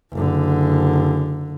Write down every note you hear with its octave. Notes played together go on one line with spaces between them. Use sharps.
F#1 D3